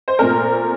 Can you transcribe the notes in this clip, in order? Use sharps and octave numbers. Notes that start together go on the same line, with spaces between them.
C5
A#2 A3 C4 A#4